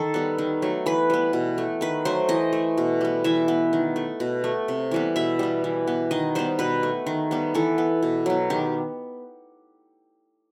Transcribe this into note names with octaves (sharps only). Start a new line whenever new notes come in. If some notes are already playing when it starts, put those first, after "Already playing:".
Already playing: D#3 A4
G3 B3
D#3
F#3 A3
E3 B4
G3 B3
B2
A3
D#3 B4
F#3 A3 C5
E3 D#5
A3
B2
G3 B3
E3 E5
B3
D#3
A3
B2
A3
C3
E3 G3 B3
B2 E5
G3 B3
E3
B3
D#3 D#5
G3 B3 C5
B2 B4
A3
D#3
G3 B3
E3 A4
B3
B2
F#3 B3
D#3 G4